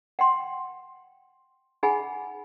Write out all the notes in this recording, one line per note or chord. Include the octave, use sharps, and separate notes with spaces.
F#5 G5 C6
D#4 G#4 F#5 G#5 B5